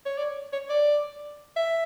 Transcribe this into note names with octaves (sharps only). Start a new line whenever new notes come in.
C#5
D5
C#5
D5
E5